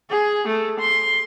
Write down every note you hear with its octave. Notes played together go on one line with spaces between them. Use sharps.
G#4
A3
C6